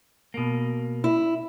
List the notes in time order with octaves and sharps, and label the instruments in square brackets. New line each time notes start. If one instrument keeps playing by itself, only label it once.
[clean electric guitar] B2 A#3
[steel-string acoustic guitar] E4